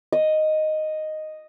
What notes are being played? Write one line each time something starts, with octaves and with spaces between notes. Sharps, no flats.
D#5